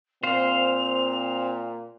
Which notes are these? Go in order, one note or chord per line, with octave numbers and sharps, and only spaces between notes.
A#2 C4 C5 F5 F7